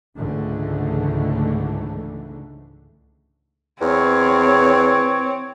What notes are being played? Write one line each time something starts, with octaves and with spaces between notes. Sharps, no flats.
C#2 G#2 D3 E3 A3
E2 C4 C#5